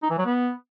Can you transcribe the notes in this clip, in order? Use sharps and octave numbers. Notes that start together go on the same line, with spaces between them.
D#4
E3
F#3
B3